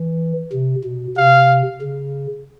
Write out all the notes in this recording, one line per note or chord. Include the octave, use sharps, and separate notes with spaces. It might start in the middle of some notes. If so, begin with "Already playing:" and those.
Already playing: E3
C3
B2
C3 F5
C#3